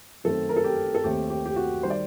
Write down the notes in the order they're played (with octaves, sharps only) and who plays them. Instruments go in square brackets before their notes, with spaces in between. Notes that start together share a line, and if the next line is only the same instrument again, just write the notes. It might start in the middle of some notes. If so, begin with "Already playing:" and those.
[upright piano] F#2 D#3 A3 C4 A4
A#4
A4
G4
A4
D#2 D#3 A3 C4 G4
G4
G4
F#4
D#3 G3 C5
D5